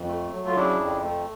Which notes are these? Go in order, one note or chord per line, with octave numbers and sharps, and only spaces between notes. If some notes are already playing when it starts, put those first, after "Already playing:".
Already playing: F2
A3
F#3
F4
C#3 D4 E4
F2
A3